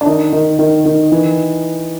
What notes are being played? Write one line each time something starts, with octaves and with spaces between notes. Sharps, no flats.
D4
D#3 D#4
D#3
D#3
D#3
E3